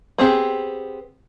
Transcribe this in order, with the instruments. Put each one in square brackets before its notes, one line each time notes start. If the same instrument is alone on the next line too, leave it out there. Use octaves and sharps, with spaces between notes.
[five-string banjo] B3 C4 G4 G#4